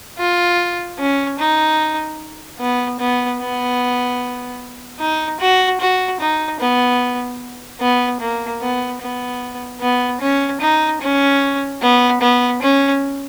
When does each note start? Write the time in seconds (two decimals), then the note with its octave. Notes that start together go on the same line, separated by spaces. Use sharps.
0.18 F4
0.99 C#4
1.39 D#4
2.59 B3
2.99 B3
3.40 B3
5.00 D#4
5.40 F#4
5.80 F#4
6.20 D#4
6.60 B3
7.80 B3
8.20 A#3
8.61 B3
9.01 B3
9.81 B3
10.21 C#4
10.61 D#4
11.01 C#4
11.82 B3
12.21 B3
12.61 C#4